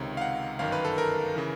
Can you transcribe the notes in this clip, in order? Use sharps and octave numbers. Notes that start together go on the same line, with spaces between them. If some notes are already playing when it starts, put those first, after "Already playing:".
Already playing: C#2 C3 D#3 C#5
F5
F#5
G1 F#2 D#3 F5
B4
A4
A#4
C#3 E3